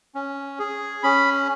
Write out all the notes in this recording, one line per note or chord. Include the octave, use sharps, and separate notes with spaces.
C#4
G#4
C#4 B5